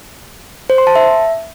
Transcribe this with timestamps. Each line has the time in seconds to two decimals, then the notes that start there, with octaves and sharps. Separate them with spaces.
0.70 C5
0.78 C6
0.87 A5
0.95 E5